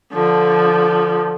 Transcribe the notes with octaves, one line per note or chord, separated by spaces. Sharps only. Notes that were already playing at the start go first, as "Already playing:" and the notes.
D3 F3